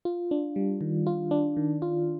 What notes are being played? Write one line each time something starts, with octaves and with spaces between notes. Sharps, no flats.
F4
D4
G3
D#3
F4
D4
D#3
F4